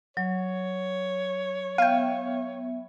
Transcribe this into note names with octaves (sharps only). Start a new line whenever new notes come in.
F#3 C#5
B3 E5 F5 G5